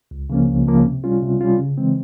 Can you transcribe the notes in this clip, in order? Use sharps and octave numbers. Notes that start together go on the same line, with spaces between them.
C#2
C#3 F3 A#3 C#4
C#2
C#3 F3 A#3 C#4
C3
G3 C#4 F4
C3
G3 C#4 F4
C#3
E3 G#3 C4